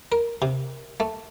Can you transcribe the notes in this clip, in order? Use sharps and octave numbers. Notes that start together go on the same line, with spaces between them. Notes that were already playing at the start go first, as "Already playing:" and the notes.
A#4
C3
A3